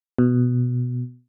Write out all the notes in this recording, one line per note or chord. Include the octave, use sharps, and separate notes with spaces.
B2